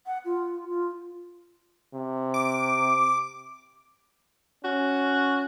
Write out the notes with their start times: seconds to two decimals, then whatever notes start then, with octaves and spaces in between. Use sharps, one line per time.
0.06 F#5
0.25 F4
0.69 F4
1.94 C3
2.34 D6
4.64 C#4 F#4